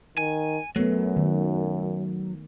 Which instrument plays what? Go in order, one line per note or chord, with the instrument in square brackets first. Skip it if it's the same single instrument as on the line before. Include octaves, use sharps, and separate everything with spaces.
[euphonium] D#3 [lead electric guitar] G#5
[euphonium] F#2 [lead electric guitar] F#3 [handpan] A3 B3
[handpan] D#3